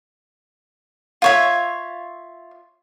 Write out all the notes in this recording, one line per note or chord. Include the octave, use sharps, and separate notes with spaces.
F4 C#5 E5